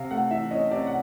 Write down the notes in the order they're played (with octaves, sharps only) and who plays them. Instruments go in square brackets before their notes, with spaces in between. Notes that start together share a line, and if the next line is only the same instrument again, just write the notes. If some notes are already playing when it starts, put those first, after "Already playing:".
Already playing: [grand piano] C3 F5
A3 F#5
E3 E5
C#4 D#5
C3 D5
F#5